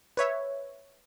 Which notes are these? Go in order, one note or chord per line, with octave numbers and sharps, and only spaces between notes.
B4 C#5 E5